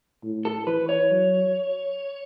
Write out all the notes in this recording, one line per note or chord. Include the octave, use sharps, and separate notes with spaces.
A2
A4
E3 B4
C#5
F#3